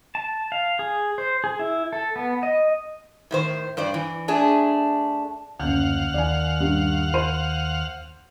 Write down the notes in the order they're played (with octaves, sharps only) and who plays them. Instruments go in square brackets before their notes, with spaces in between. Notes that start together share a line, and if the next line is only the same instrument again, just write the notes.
[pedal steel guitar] A5
F5
G#4
C5
G#4
E4
A4
B3
D#5
[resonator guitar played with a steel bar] A2 D#3 C5
G2 C5 D5
E3
A3 D4 G#4
[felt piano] F#1 G6 [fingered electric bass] D2 [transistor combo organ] F5 F#5
[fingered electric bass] D#2 [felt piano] D5 G#5
[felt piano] G2
C5 C6 D#7